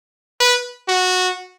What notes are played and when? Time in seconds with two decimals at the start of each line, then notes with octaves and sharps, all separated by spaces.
0.40 B4
0.88 F#4